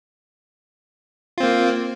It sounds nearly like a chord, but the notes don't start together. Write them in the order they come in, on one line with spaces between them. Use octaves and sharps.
F4 C4 A#3